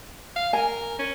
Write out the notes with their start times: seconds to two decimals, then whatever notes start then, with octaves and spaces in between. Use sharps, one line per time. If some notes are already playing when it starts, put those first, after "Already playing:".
0.36 F5
0.53 A#4 G#5
0.99 C#4